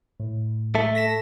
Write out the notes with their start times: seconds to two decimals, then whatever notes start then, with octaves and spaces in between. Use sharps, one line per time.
0.20 A2
0.75 A3 A4
0.95 A#6 B6 E7